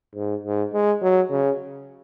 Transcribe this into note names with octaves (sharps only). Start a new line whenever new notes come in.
G#2
G#2
G#3
F#3
C#3